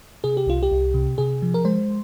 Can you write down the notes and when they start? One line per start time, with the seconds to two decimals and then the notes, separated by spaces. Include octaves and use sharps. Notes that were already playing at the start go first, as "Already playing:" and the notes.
0.24 C3 G#4
0.37 G4
0.47 C2 F4
0.63 G4
0.72 C2
0.94 C3
1.18 C3 G#4
1.42 F3
1.54 A#4
1.65 G#3 C5